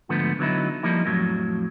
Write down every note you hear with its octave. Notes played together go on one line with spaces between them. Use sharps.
G#2 D3 F3 A3 B3
D3 F#3 B3 D#4 E4
F3 G3 A#3 D#4 E4
F2 A2 F#3